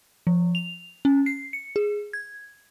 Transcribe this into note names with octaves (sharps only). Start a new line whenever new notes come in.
F3
F7
C#4
C7
C#7
G#4
G#6